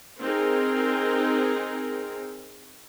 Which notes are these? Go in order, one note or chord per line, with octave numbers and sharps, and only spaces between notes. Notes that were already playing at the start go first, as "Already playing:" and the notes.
C4 D#4 G#4 A#4